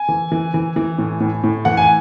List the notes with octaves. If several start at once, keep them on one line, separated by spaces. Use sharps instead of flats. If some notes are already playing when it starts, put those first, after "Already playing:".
Already playing: G#5
E3
E3
E3
E3
A2
A2
A2
E3 F#5
G#5